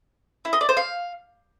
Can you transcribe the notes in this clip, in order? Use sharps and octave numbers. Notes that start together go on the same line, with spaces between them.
E4
D#5
D5
C5
F5